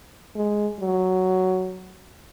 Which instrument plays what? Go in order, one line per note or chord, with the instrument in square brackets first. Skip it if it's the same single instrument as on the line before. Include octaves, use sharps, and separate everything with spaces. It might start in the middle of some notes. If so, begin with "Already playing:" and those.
[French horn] G#3
F#3